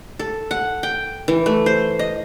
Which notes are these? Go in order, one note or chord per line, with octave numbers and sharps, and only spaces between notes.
A4
F#5
G5
E3
A3
C5
D#5